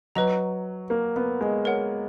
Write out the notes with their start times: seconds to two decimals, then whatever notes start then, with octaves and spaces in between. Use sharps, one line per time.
0.15 F#3 B4 D#5 A#5
0.90 A#3
1.16 B3
1.41 G#3
1.65 A#4 C#5 F#5